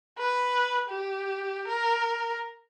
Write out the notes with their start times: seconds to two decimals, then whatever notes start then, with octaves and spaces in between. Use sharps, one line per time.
0.18 B4
0.90 G4
1.68 A#4